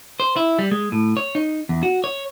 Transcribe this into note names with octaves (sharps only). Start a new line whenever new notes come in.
C5
E4
G3
G#3
A2
C#5
D#4
E2
F#4
C#5